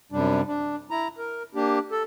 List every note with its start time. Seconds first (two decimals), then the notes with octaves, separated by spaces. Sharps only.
0.12 F#2 C3 G3 D4
0.48 D4
0.91 E4 A#5
1.18 A#4
1.55 A#3 D4 G4
1.92 A4